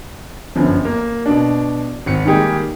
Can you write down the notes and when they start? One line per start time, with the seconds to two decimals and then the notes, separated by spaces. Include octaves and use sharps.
0.56 G1 F#2 D3 F3
0.85 A#3
1.26 B2 D4
2.06 G#1 C#7
2.25 D#3 G3 G#3 A#3 G4 G#4